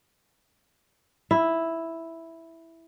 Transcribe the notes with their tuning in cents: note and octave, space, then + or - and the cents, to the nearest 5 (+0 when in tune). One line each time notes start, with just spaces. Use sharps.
E4 +0